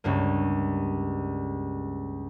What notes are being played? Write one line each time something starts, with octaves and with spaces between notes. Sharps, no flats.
C#2 G2 A#3